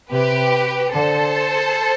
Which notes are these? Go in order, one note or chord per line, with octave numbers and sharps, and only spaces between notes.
C3 G4 B4
D3 A4 C5